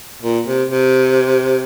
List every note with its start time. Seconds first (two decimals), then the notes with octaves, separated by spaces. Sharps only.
0.22 A#2
0.47 C3
0.70 C3